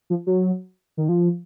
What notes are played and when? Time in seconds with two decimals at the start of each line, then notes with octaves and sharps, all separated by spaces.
0.10 F3
0.27 F#3
0.97 D#3
1.09 F3